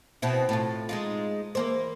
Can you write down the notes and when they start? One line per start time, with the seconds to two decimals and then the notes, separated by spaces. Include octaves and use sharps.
0.22 B2 C4 E4
0.49 A2 F4
0.89 G#3 D#4 F4
1.55 E3 A#3 C5